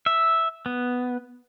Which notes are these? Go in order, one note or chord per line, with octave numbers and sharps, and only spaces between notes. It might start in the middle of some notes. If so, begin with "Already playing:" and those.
E5
B3